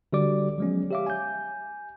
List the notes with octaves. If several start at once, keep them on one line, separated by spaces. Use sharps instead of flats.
D3 G3 F#4 G4 D5 D6
F3 F#3 G#3 B3 C#4
G4 C#5 E5 F5 D6
G#5 G6